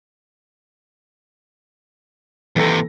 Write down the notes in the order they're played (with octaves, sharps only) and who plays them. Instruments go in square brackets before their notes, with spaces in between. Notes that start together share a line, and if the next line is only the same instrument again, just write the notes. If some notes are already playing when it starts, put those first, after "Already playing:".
[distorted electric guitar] D#2 C3 [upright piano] E3 A4 A#6